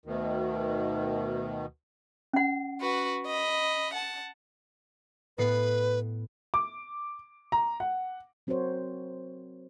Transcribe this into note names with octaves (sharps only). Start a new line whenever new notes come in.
D2 B2 D#3
C#4 F#5
F#4 B4
D#5 B5
F#5 A5
A2 B3 B4 C7
D6
A#5
F#5
F#3 C4 F#4 A#4 C5 C#5